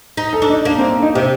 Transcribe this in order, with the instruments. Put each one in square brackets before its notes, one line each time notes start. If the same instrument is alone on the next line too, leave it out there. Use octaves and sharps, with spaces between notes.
[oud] D#4
[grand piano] A4
[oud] D4
[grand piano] D#4
[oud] A#3 [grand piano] D4
[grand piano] C4
D#4
[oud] C3 [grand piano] G4